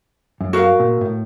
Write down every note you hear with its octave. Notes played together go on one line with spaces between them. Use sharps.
F#2
F#4 A#4 F5
A#2
A2